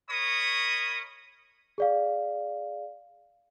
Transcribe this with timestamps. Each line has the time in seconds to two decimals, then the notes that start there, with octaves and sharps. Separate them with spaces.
0.10 A#4 C#5 D#5 B5 C#6 D#6
1.78 G#4 D5 F5